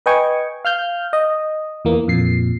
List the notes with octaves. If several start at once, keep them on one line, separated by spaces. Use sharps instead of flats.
B4 D#5 G5 G#5 C#6
F5 F6 G6
D#5
E2 E3 A#3
F2 A#2 C7